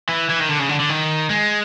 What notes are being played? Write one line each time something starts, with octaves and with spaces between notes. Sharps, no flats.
E3
E3
D#3
D3
C#3
D3
D3
D#3
G#3